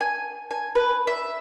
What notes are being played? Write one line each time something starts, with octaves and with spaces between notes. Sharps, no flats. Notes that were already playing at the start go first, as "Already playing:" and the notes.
G#5
G#5
B4
E5